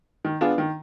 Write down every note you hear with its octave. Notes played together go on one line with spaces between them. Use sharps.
D#3
B3 D4 F4 G#4
D#3